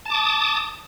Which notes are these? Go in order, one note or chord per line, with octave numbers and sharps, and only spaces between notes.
A5 D6 D#6